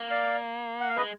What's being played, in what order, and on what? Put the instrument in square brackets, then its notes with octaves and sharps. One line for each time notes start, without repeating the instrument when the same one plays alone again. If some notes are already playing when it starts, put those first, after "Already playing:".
Already playing: [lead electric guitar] A#3
[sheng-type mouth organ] D5 F5
F#5
F5
[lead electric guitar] G#3 [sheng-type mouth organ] B4 D#5